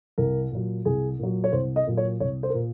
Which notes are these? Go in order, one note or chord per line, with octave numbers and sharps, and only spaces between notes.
C2 A#4
A#2 F#3
C2 G#4
A#2 F#3
C#5
C2 C5
D#5
A#2 F#3
C#5
C2 C#5
C5
A#4
A#2